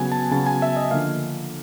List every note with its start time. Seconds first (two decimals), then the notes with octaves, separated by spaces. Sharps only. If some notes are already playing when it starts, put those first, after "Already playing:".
Already playing: C#3 F#3 B3 G#5
0.12 A5
0.31 C#3 F#3 B3 A5
0.47 G#5
0.62 E5
0.77 D#5
0.91 D3 F3 A#3 F5